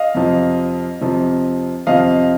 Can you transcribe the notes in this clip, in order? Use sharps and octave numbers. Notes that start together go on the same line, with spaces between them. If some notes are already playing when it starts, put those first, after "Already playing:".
Already playing: D#5 F5
F2 C3 F3
F2 C3 F3
F2 C3 F3 D#5 F5